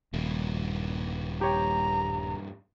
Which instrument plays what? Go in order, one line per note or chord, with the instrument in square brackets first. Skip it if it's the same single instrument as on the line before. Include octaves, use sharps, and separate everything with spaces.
[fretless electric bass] D#1 [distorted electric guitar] G2 A#3
[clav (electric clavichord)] G4 C#5 G5 [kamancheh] A#5